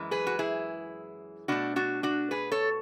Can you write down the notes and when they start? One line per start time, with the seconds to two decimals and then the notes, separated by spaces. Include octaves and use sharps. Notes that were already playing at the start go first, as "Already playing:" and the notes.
Already playing: F#2 E3 G#3
0.11 G#4 B4
0.27 F#4
0.39 E4 G#4
1.48 B2 A3 D4 F#4
1.76 D4 F#4
2.03 D4 F#4
2.31 G#4 B4
2.52 A4 C#5